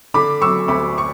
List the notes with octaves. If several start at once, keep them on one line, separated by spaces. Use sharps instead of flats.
D3 B5 D6
F#3 C#6 E6
D2 B5 D6
C#6